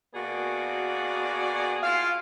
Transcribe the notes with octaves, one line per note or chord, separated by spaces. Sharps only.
B2 A#3 F#4 G#4 D5
E4 F4 F5